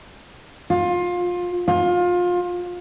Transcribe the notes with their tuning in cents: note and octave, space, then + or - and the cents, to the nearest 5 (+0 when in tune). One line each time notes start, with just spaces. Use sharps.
F4 +20
F4 +25